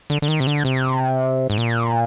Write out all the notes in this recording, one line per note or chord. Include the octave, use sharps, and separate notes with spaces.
D3
D3
D#3
C3
D3
C3
G#2
A#2